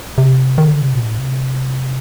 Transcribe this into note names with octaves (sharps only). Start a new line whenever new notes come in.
C3
D#3
D3
C3
A#2
A2
C3